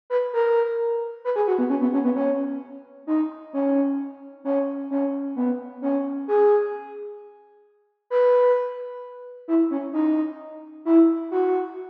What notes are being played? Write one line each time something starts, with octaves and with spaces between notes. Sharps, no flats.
B4
A#4
B4
G#4
F#4
B3
C#4
B3
C#4
B3
C#4
D#4
C#4
C#4
C#4
B3
C#4
G#4
B4
E4
C#4
D#4
E4
F#4